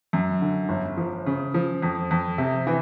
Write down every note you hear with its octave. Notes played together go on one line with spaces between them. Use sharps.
F#2
D3
G1
F3
C#3
F3
F2
F2
C3
E3